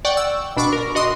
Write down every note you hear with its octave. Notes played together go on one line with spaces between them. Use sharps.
D5 F#5 G5 C#6
E6
B2 D4 B5 C#6 D6
A#4
F#4 D#5 C6 D#6